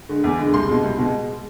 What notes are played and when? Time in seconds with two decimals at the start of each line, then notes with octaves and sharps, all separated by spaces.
0.09 D3 G#3
0.24 E2
0.39 D3 G#3
0.54 C2 C6
0.68 B2 G#3
0.84 C2
0.98 B2 G#3